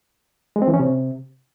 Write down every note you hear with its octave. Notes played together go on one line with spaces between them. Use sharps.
G#3
C4
E3
C#4
C3